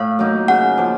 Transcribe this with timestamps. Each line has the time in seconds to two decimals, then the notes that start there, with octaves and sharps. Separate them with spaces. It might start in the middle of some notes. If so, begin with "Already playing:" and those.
Already playing: A2 F5
0.19 F#3 A#3 D#4
0.48 C#3 F#5
0.78 F3 A#3